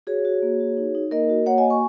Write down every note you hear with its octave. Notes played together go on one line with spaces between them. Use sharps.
F#4 G#4 C#5
F#4
A#3
F#4
D#4
D#4
A#3 A#4 D#5
F#4
A#3 C#5 F#5
D#5 G#5
F#4
G#5 C#6